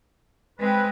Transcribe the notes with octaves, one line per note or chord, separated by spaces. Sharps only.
G#3 C4 B4